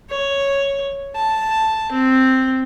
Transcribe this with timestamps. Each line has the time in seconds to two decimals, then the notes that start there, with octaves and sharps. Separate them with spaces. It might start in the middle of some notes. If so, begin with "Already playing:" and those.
0.10 C#5
1.16 A5
1.92 C4